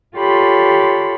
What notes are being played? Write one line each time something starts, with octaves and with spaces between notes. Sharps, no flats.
F4 G4 A4 C#5 B5 C6